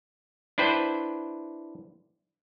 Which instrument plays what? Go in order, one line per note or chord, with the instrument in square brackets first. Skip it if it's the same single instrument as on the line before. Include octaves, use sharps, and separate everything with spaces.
[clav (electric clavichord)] D4 E4 B4 C5 G5